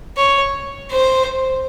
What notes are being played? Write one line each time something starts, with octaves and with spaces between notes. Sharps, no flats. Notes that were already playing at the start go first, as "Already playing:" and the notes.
C#5
C5